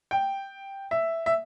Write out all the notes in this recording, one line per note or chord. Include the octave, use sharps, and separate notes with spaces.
G5
E5
E5